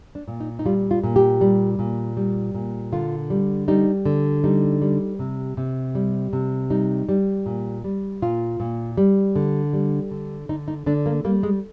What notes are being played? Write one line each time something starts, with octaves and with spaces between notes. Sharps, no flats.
D4
A#2
D#4
D#4
G3 F4
F4
A#2
G4
G3
A#2
G3
A#2
D3 F4
G3
G3 D#4
D3
G3 D#4
G3
C3
C3
G3
C3
G3 D#4
G3
A#2
G3
A#2 F4
A#2
G3
D3
G3
D3
D3 D#4
D#4
D3 D4
A#3
G3 A#3
G#3